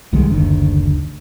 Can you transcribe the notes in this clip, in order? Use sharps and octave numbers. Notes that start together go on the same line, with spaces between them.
C2 D#3 G3 G#3
F#1 D2 D#3 D4